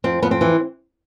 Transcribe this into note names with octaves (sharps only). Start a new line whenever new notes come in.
F2 C4
F2 B3
C4
E3